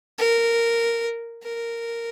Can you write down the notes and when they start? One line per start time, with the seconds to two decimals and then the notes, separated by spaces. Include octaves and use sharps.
0.18 A#4
1.44 A#4